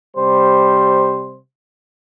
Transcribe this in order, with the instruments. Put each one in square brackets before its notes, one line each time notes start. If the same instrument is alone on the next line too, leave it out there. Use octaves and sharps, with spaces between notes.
[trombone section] C3 G3 C5